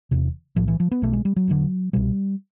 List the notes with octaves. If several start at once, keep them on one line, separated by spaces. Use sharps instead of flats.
E1 E2 C3
B1 A2 F3
E3
F3
B3
B1 B2 A3
G#3
G3
F#3
E1 D2 D3
C2 B2 G3